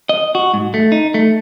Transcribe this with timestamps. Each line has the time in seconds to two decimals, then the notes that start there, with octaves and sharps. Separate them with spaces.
0.09 D#5
0.35 F#4
0.54 G#2
0.74 A3
0.92 D#4
1.14 A3